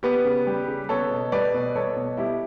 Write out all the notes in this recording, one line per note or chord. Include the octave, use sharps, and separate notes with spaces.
B3 G4 B4
C#3
G3
C#3
B3 A4 C#5
B2
G3 B4 D5
B2
B3 A4 C#5
B2
G3 E4 G4